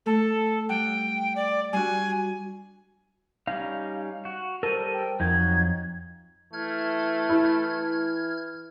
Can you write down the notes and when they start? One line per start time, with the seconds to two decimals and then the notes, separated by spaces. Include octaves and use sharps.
0.06 A3 A4
0.69 G3 F#5 G5
1.36 D5
1.73 G3 D4 F#4 G#5
3.47 G3 C#4 D#4 F5
4.25 F#4
4.63 G3 A4 A#4 C5 D#7
4.93 G5
5.20 F2 F#3 D#4 G#6
6.53 E3 A3 F6 G#6
7.29 E4